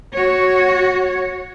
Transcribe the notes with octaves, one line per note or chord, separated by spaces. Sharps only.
F#4 C#5